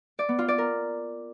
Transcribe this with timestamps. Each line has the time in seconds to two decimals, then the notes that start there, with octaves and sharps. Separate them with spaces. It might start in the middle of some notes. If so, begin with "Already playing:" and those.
0.19 D5
0.29 B3
0.39 F4
0.48 D5
0.58 A#4